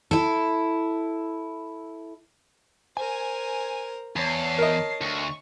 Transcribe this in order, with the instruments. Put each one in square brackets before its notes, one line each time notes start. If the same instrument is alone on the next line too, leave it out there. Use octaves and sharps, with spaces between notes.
[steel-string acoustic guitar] E4 A4
[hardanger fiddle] A#4 C5 [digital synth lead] G#5
[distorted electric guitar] E2 [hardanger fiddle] C#5 A5 [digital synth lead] C7
[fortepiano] A#4 D#5
[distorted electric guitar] D2 [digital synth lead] C#6